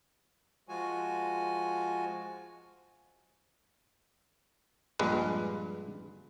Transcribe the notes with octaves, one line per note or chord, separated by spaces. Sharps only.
F3 G#3 F4 F#4 G#5
A#1 G2 G#3 B4